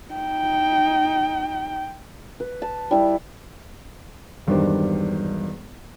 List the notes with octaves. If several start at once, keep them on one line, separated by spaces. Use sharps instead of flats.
D#4 G5
B4
A5
G3 E4
E1 G2 D#3 D4 G4 C5